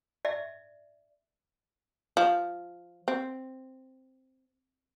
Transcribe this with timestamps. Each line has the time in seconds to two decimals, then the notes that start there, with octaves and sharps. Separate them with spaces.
0.25 D5 E5
2.17 F3
3.08 C4